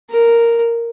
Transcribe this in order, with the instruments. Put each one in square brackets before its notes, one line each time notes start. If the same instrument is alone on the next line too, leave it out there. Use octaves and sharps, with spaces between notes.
[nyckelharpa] A#4